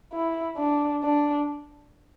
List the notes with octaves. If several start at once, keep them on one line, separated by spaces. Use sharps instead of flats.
E4
D4
D4